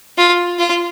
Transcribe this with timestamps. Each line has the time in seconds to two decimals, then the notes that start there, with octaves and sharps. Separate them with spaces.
0.18 F4
0.59 F4